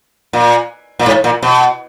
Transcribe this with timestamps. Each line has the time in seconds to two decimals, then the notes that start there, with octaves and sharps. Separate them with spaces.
0.33 A#2
0.99 A#2
1.06 G#2
1.24 A#2
1.42 B2